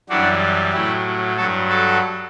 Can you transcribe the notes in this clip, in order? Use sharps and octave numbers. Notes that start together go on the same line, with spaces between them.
F#2 E3 G3 D4 F#4
A2 F#3 E4 G4
G2 F#3 F#4 A4
F#4 A4